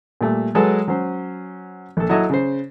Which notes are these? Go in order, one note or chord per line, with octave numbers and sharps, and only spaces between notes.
A#2 G3 A3
F#3 G#3 A4 B4
F#3 C#4 C5
A#1 A4
F#3 E4 A4 C#5 D#5
C#3 C5